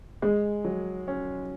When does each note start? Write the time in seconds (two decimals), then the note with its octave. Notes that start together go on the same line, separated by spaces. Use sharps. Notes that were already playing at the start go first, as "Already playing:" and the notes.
0.22 G#3 G#4
0.64 F#3
1.08 C#4